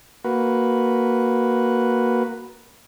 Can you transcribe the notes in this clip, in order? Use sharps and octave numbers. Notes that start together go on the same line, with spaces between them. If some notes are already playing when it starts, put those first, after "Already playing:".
A#3 F#4 B4